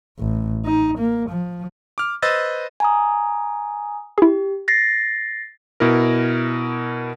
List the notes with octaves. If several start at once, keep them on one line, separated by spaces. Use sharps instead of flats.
A1
D#4
A#3
F3
D6 F6
B4 C5 D#5 E6 A6
G#5 A#5 D#6
E4 G4 G#4
A6 A#6 C7
B2 E4 A#4